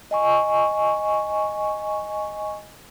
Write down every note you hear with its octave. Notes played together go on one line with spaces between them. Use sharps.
D#5 G#5 C#6